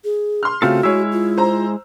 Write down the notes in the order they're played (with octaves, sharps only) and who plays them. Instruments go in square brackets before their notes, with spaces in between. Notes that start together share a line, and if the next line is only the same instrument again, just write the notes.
[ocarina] G#4
[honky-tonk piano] C6 F6
[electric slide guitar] C#3 C4 A4 [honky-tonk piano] A3 F4 [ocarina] F#4
[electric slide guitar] G#3 E4 [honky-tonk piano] C#5 E6
[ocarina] F4
[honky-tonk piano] C5 A#5